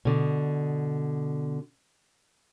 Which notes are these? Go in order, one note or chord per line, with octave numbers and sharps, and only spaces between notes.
B2 D3